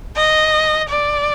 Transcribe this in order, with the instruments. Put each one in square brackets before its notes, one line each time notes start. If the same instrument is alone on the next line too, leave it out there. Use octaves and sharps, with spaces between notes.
[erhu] D#5
D5